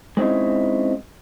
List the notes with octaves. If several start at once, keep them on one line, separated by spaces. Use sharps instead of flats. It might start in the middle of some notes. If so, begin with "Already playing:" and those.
G#3 C4 C#4 D#4 E4